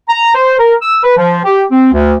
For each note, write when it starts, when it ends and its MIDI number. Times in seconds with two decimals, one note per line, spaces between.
0.09 0.34 82
0.35 0.55 72
0.59 0.74 70
0.82 1.03 88
1.04 1.14 71
1.17 1.40 53
1.45 1.64 67
1.71 1.92 60
1.92 2.14 38